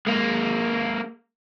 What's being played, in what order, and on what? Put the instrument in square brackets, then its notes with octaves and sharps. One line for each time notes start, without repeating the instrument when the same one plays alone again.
[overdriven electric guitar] G#3 A#3